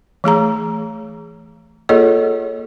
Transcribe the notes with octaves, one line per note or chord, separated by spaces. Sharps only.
E3 A3 G#4 A#5
A#3 F4 G#4 A4 C#5 D#5